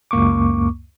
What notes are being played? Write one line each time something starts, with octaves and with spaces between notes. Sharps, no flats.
C#2 F#2 A#3 C#6 D6